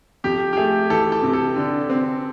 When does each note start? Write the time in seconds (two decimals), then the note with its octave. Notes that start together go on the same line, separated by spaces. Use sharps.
0.24 F2 G4
0.53 G4
0.57 A3 G#4
0.90 E3 A4
1.12 A4
1.22 C3
1.33 A4
1.56 D3
1.90 C4